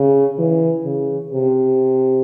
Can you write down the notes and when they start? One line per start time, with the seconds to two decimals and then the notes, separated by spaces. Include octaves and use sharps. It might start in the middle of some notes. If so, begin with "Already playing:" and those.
Already playing: C#3
0.39 E3
0.85 C#3
1.33 C3